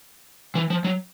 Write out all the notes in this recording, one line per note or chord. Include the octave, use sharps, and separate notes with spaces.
E3
F3
F#3